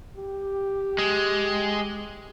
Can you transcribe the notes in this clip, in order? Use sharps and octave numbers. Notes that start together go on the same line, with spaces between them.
G4
G#3